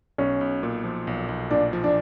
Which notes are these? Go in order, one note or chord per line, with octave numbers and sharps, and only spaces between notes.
B1 C#4
B1
A#2
F3
B1
B1
A#2 D4
F3
D4